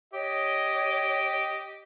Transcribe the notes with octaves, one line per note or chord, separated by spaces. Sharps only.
G4 C#5 D#5